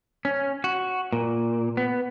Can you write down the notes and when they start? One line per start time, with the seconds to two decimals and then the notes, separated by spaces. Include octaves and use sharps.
0.25 C#4
0.64 F#4
1.12 A#2
1.77 B3